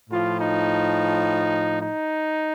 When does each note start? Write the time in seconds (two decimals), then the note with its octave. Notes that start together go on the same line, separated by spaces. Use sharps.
0.10 A2 F3 F4
0.39 D#4
1.80 D#4